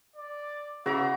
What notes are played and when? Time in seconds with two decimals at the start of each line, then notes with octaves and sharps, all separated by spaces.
0.16 D5
0.86 C#3 E3 B3 F#4 E5 A#5